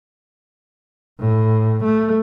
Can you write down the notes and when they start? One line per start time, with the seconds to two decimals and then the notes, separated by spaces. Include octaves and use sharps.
1.20 A2
1.83 A3